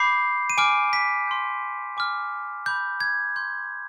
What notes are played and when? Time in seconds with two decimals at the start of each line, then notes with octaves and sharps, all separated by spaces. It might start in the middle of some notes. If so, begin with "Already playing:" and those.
Already playing: B5 D6 G6 C7
0.50 D#7
0.57 G#5 D6 F6 D7
0.93 B6
1.27 C6 G6
1.97 G#5 D6 F6
2.66 B5 D6 G6
3.00 G#6
3.36 C6 G6